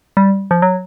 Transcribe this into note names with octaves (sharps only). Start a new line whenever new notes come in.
G3
F3
F#3